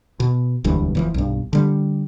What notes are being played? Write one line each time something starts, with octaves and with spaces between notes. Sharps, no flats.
B2
E1 D2 G2 E3
F1 E3 F3
B1 G2
D3 G3